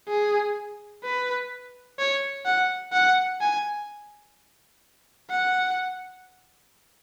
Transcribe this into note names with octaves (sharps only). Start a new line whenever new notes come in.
G#4
B4
C#5
F#5
F#5
G#5
F#5